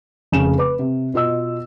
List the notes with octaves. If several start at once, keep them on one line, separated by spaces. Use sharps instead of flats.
F1 C#3 G#4 E7
B4 D6
C3
B2 F4 D#5 E6